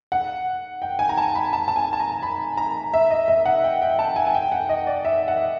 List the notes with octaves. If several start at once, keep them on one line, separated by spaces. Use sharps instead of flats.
F#5
G5
G#5
A#5
A5
B5
A5
A5
G#5
A5
A#5
B5
A#5
E5
D#5
E5
F#5
G5
G5
A5
G#5
G#5
G5
F#5
D#5
D5
E5
F#5